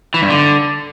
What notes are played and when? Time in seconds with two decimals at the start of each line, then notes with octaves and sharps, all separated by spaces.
0.14 E3
0.22 G2
0.30 D3